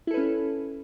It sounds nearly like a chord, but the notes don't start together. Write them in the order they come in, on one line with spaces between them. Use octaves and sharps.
E4 A4 B4 C#4